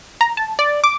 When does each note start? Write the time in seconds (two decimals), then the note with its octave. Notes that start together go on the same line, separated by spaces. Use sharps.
0.21 A#5
0.37 A5
0.59 D5
0.84 D6